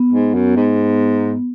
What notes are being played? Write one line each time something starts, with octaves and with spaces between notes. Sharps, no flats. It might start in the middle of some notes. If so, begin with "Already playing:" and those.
Already playing: B3
G#2
F#2
G#2